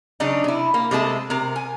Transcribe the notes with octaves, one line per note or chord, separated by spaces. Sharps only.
C#3 F#3 D4 D#4
C3 E4
A#3
C3 G#3 A3 A5
C3 A#4
G#5